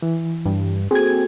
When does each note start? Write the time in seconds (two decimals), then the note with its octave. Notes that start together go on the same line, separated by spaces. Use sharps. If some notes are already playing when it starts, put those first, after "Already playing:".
0.02 E3
0.45 G2
0.91 A#3 C4 F#4 G#4 A4 G#6